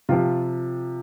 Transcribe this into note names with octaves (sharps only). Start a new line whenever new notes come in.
C3 F3 F4